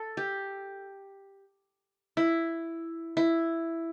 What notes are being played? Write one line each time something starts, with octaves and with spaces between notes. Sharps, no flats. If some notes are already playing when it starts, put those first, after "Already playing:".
Already playing: A4
G4
E4
E4